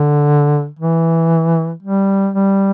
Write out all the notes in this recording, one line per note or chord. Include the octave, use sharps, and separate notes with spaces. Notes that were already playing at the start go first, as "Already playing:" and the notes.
Already playing: D3
E3
G3
G3